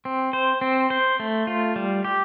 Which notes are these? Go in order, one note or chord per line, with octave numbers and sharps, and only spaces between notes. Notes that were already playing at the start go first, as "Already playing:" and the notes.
C4
C5
C4
C5
A3
F4
G3
G4